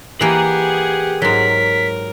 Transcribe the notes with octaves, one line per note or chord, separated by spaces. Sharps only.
E3 A#3 G4 G#4 F#5 G#5
G#2 F#3 A#4 B6